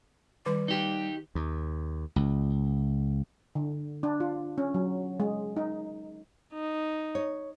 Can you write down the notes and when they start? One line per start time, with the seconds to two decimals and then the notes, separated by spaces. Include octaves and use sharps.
0.46 D#3 G3 D6
0.68 D#4 G4
1.35 D#2
2.16 C#2
3.55 D3
4.03 D4
4.20 F4
4.58 C#4
4.74 F#3
5.20 G#3
5.57 D#4
6.53 D#4
7.15 C#5